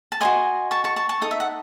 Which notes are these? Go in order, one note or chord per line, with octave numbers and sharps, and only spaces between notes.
A5
F#4 C5 D#5 G#5 C6
A5 C#6
A5 C#6
A5 C#6
A5 C#6
D#4 A4 D#6
E5
F#5